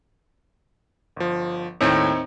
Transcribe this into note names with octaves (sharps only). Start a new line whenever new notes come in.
G1 F3
D#2 A2 C4 D#4 C#5